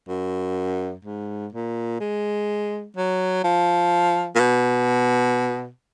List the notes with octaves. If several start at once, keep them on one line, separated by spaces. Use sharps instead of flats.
F#2
G#2
A#2
G#3
F#3
F3
A#2
B2